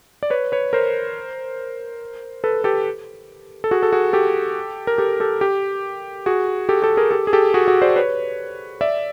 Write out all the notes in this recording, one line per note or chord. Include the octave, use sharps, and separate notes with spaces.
D5
B4 C#5
B4 C#5
A#4 C5
A4 B4
G4 A4
A4
F#4 G#4
A4
F#4 G#4
G4 A4
A#4
G4 A4
G4 A4
G4
F#4 G#4
G4 A4
G4 A4
G#4 A#4
G4 A4
G#4
G4 A4
F#4 G#4
F#4 G#4
C5 D5
B4 C#5
D5 E5